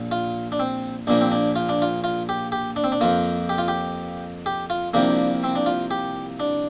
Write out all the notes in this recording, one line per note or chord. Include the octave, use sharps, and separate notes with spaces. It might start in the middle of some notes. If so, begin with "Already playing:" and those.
Already playing: A#1 A#2
F4
D4
C4
A#1 A#2 F3 A#3 D4
C4
D4
F4
D4
F4
F4
G4
G4
D4
C4
D4
F2 F3 A#3 F4
G4
F4
G4
G4
F4
C2 C3 F3 A#3 D4
C4
D4
F4
G4
D4